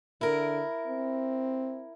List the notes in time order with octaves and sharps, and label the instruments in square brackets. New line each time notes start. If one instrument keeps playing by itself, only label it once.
[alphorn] D3 [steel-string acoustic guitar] E4 A#4
[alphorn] C4